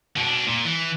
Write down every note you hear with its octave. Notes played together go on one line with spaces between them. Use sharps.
B2 D4
A#2
E3